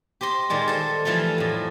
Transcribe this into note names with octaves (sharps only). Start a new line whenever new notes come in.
G4 C5 D#5 C6
A#2 D#3 G3 G#3 F4
A4 C5
E3 F3 G3 A3 F4
F2 A2